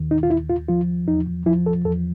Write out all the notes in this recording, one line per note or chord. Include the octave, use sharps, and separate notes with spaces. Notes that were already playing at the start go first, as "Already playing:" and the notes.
Already playing: D#2 D#3
D#4
F4
D#2 E4
F4
F3 F4
E2 D#4
F3 E4
A4
E2 A4